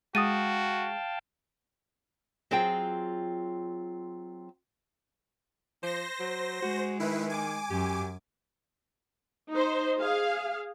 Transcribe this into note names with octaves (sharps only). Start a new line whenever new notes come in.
G#3 F#4 F5 G5 A5 D#6 A6 D#7
F#3 C4 F4 G#4 G5
F3 C5 A#6
F#3
G#3 F#4
D#3 E4 B4
G#5 D6
F#2 G4
D#4 C5
G#4 F5